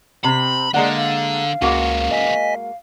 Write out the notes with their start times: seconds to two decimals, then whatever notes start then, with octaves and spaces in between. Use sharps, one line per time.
0.24 C3 C4 B5
0.74 D3 G#3 A#3 D5 F#5
0.96 F5
1.62 C#2 G#3 A#3 B3 C#4 F#4
2.11 D#5 G#5 B6